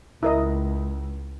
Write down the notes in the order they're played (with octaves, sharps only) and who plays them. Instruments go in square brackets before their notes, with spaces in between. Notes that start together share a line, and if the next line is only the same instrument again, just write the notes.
[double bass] C#2 [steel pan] E4 A#4 D#5